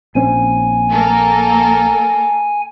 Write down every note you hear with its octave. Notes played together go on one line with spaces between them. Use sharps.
A#1 C4 C#4 G#5
A#3 A4 A#4